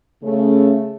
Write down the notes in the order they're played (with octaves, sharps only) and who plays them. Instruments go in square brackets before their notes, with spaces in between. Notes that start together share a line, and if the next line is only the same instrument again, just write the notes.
[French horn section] C#3 A3